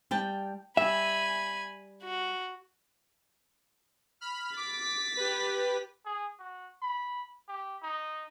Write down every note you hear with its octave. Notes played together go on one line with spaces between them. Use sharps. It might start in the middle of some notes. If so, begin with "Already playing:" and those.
G3 G5 A5
G3 E5 G#5 B5
F#4
B5 F6
D6 A6 B6
G4 B4
G#4
F#4
B5
G4
D#4